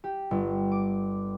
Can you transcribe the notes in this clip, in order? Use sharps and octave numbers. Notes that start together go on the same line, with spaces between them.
G4
G1
D6